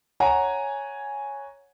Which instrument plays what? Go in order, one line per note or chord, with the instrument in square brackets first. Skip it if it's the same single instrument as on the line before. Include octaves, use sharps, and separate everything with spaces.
[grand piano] C#5 F#5 G#5 A#5